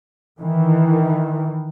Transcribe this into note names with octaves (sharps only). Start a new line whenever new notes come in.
D#3 E3